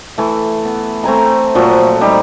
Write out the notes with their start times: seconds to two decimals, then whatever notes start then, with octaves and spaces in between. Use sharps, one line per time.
0.18 E3 A3
0.65 B3
1.03 A3 C4 G#5 A#5
1.55 A#2 F3 F#3 A3
2.01 G3 D#4